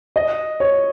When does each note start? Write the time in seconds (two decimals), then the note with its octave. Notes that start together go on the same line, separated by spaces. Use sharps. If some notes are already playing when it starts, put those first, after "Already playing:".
0.16 D#5
0.60 C#5